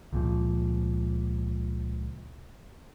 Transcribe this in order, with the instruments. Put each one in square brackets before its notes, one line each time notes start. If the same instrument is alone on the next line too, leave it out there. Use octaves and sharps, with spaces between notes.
[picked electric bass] C#2 A#2 F3